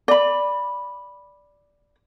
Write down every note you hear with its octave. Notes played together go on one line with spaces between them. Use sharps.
D5 B5